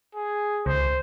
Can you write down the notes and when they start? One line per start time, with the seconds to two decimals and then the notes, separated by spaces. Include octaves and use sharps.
0.15 G#4
0.66 C#2 C5